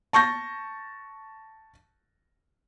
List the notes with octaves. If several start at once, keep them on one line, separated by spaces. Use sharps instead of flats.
A5 C#6 G6 A#6